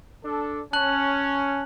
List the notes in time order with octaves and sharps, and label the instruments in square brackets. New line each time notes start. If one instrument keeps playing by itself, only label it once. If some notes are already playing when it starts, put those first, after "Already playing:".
[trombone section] D4 A4
[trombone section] C#4 [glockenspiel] A5 F#6 F#7